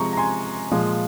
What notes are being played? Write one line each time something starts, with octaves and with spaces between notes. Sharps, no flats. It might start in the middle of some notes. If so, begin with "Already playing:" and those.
Already playing: C3 F3 G#3 A#5 C#6
A#5
G#5 C6
A#2 F3 G#3